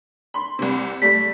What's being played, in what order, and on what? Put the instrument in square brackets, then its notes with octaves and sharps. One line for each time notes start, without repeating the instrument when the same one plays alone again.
[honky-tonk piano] B5 C6
C2 C3
[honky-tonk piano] G3 A3 [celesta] B6